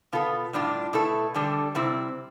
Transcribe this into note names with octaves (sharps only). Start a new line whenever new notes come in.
B2 B3 F4 A4
A2 G3 D4 F4
B2 A3 E4 A4
D3 G3 D4 A4
C3 G3 C4 E4